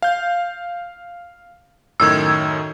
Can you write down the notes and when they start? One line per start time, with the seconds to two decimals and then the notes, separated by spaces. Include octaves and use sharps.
0.02 F5 G6
2.00 F#2 A2 D#3 E6 G#6